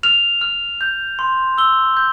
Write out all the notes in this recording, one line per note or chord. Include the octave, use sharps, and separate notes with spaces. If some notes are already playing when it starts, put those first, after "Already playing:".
F6 F7
F6
G6
C6
E6 G7
G6